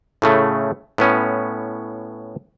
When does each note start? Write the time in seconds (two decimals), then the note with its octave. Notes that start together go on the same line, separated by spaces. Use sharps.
0.22 A2 C#3 A3
0.98 A2 B3 C#4